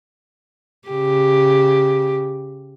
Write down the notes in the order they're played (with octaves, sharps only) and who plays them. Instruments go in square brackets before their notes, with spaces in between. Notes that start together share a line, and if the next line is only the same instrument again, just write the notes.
[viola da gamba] C#3 G4